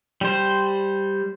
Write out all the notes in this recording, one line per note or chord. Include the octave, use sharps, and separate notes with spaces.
G3 C5